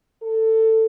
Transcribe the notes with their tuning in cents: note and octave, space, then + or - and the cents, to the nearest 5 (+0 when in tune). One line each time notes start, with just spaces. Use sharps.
A4 +20